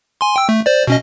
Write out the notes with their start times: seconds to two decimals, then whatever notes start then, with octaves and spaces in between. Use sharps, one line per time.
0.21 G#5 C6
0.36 G5 E6
0.49 A3
0.66 C5 D5
0.87 B2 C#4 D#5